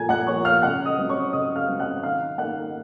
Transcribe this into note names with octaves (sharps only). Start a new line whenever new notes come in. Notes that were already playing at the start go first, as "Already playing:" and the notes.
Already playing: A#2 F3 A#3 G#5 A#5 G#6
F#5 F#6
F3 A#3 C#5 C#6
F5 F6
C#3 F#5 F#6
D#5 D#6
F#3 C4
C#5 C#6
C#3 D#5 D#6
F5 F6
F#3 C4
F#5 F#6
D#3 F5 F6
A#3 D#4 F#5 F#6